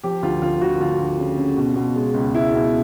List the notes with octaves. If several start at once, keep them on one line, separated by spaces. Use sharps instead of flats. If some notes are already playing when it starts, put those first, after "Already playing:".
F3 G4
D2 F4
D2 F4
D2 F#4
D2 F4
D2
C#3
C#3
B2
B2
G#3
C#2
G#3 E4
B2